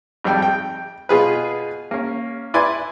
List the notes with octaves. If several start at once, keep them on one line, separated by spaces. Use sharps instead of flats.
G#1 F2 G3 G5
G5
B2 F4 G#4 B4
A#3 C#4
E4 B4 D5 G#5 C6